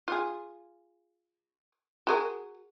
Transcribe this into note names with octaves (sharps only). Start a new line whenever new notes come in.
F4 G#4
F#4 G#4 A#4